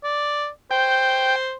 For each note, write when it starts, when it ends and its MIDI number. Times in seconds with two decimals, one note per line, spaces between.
0.04 0.48 74
0.71 1.56 72
0.71 1.36 79